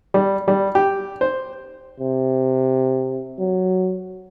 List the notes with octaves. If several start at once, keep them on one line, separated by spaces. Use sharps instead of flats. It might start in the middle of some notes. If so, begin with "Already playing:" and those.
G3
G3
G4
C5
C3
F#3